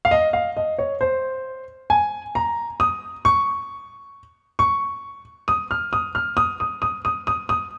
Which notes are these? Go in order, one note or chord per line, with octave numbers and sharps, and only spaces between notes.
F5
D#5
F5
D#5
C#5
C5
G#5
A#5
D#6
C#6
C#6
D#6
F6
D#6
F6
D#6
D#6
D#6
D#6
D#6
D#6